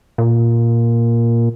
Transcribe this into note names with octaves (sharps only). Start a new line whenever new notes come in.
A#2